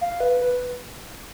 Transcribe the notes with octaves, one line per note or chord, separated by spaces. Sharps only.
F5
B4
B4